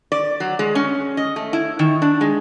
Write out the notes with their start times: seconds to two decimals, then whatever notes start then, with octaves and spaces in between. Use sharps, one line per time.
0.12 D5
0.40 F#3
0.59 G#3
0.75 C#4
1.17 D#5
1.36 A3
1.53 E4
1.79 D#3
2.02 D4
2.21 G#3